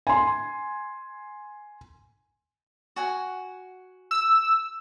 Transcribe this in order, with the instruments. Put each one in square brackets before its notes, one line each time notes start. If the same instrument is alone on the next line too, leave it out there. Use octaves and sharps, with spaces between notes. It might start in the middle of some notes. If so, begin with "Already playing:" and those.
[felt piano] G#5 C6
[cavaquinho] F#4 F#5 G#5
[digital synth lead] E6